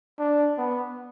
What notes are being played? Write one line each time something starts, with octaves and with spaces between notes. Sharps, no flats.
D4
B3